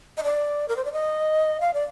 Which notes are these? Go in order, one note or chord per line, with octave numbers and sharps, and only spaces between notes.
D#5
D5
A#4
C5
D5
D#5
F5
D5